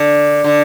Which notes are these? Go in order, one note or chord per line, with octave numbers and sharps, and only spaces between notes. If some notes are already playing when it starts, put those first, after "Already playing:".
Already playing: D3
D3